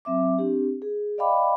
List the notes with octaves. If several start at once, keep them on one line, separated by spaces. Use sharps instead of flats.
F#3 C4 E5 D6
C4 D4 G4
G#4
D5 D#5 F5 G5 B5 D6